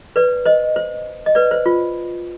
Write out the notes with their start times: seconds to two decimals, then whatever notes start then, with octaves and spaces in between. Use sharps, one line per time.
0.16 B4 D5
0.45 C5 D#5
0.76 C5
1.26 D#5
1.35 B4 D5
1.51 C5
1.66 F4